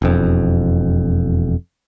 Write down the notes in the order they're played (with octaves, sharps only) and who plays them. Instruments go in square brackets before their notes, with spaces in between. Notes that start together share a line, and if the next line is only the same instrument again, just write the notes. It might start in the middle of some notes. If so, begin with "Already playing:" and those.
[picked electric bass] E1 F2